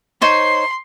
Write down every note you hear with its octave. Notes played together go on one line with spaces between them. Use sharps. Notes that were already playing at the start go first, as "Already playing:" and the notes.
D#4 C5 C#5 C6